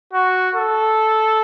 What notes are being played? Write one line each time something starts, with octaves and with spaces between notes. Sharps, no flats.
F#4
A4